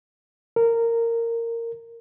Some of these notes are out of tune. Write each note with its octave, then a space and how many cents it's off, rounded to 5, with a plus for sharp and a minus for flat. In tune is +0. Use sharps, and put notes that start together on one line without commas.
A#4 -15